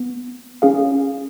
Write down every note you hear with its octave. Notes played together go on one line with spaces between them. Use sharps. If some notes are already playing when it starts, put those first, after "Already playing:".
Already playing: B3
C#4 G#4 F5